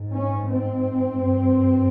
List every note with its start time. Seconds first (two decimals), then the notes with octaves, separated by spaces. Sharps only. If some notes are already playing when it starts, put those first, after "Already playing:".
Already playing: G#2
0.11 C#4
0.48 C4
1.22 G2